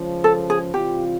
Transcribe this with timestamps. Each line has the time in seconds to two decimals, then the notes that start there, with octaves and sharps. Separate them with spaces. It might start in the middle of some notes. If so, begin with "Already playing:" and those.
Already playing: C#2 C#3 F3
0.24 A4
0.50 G#4
0.73 C3 E3 G3 C4 F4 G4